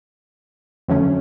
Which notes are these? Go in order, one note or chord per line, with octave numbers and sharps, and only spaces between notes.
F2 D3 F#3 A3 C#4